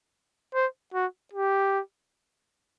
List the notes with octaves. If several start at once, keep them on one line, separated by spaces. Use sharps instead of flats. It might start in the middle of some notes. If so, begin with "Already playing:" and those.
C5
F#4
G4